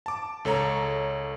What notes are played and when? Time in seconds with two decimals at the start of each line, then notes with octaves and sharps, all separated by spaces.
0.06 A5 D6
0.45 C#2 A4 C#5 A#5